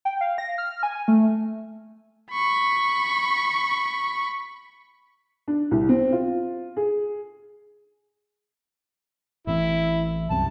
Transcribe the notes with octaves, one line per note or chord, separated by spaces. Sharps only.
G5
F5
A#6
F6
G#5
A3
B5 C#6
D4
C2
C4
F4
G#4
A1 E3 C4 E4
C2 F#2 C3 A5